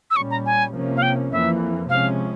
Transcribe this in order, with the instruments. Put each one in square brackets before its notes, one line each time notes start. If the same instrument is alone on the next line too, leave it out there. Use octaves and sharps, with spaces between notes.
[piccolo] E6
[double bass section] A#2 G3 C#4 [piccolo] C#6
[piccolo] A#5
G#5
[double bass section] C3 F3 A#3 C#4
[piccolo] F5
G5
[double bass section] F2 E3 A#3 [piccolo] E5
[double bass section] C3 F3 G#3 C#4 [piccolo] F5